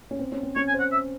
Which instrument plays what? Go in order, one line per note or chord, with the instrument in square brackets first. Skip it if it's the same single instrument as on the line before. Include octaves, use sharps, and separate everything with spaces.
[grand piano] C#4
C4
C#4
C4
[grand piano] C#4 [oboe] C#5
[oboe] G#5
[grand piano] C5
[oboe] F#5
E5